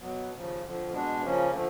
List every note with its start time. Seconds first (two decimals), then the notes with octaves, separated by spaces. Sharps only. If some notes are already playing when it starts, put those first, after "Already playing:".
0.01 B2 F#3 B3
0.31 D#2 C#3 F3
0.61 F2 D3 F3
0.91 B2 G#3 B3 D4
1.21 C#3 F3 A#3 C#4
1.52 D3 F3 A3